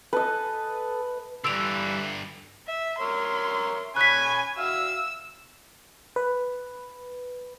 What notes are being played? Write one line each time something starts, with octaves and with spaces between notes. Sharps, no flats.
A4 B4 D#5
G2 D3 E3 G3 E5 E6 D7 F7
E5
A#4 C#5 E5 C6
C#4 G#5 B5 C#6 F#6 B6
F#4 E5 F5 E6
B4